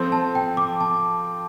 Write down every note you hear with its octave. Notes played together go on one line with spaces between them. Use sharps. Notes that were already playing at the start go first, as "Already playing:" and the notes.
Already playing: F3 C4 A4 C6
A5
G5
D6
A5